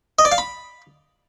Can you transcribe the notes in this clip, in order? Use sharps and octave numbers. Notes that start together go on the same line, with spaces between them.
D#5
D5
F5
B5